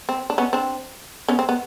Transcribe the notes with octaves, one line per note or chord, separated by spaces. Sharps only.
C4
D4
B3 C#4
C4 D4
B3 C#4
C4
B3